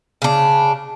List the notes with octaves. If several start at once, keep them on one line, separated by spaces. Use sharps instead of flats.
C#3 D4